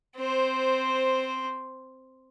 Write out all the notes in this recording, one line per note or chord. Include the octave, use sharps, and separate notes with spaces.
C4 C5